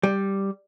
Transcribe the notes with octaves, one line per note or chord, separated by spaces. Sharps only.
G3